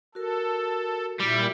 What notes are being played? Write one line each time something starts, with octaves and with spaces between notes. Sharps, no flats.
F#4 A4 A#4
A#2 G3 E4